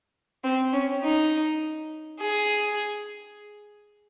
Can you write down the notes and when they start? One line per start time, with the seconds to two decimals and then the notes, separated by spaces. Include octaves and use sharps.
0.44 C4
0.73 C#4
1.03 D#4
2.20 G#4